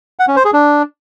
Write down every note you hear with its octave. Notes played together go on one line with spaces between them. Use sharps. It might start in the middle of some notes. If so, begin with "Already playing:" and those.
F#5
C#4
C5
G#4
D4